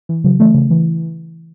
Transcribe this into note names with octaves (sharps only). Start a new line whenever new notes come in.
E3
C#3 F#3
E3 A3
C#3
E3